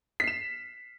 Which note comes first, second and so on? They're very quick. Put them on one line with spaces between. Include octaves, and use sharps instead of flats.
B6 C7 E7